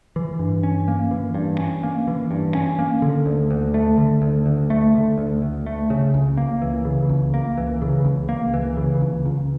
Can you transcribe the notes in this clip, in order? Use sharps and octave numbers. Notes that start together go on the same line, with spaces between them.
E3
G2
C#4
A#3
E3
G2
C#4
A#3
E3
G2
C#4
A#3
D3
D2
D2
A3
D3
D2
D2
A3
D3
D2
D2
A3
C#3
C#2
A#3
E3
C#3
C#2
A#3
E3
C#3
C#2
A#3
E3
C#3
C#2
C#2